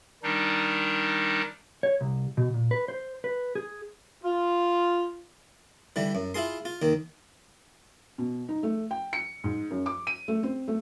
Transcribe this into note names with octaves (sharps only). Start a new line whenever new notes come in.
D#3 G3 D4 D#4
C#5
C2
B2
A#2
B4
C5
B4
G#4
F4
D3 E3 G3
F#2
E4 F4 G#4 C6
F4
D#2 D#3
B2
D#4
A3
G5
C#7
G#2
F#2
D6
D#7
A3
C4
A3